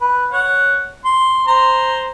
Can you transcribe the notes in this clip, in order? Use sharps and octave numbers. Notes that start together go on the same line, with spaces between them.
B4
C#5 F#5
C6
C5 A#5 C6